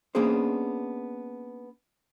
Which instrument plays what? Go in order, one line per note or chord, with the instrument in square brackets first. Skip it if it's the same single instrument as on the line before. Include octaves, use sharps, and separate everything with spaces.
[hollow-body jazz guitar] A#3 B3 C#4 D4 G#4 C5